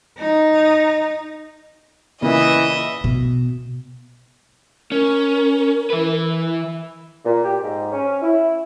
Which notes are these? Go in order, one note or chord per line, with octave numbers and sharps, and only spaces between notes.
D#4
A#2 C#3 E3 A#3 D#5 E5
B2
C#4 A#4
E3 B4
A#2
G4
G#2
C#4
E4